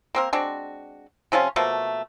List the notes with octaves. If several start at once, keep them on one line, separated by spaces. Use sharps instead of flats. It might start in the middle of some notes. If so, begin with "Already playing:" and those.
A#3 C4 A#4
G#3 C4 D4 F#4
C3 F3 C#4 F4
B2 F3 A3 A#3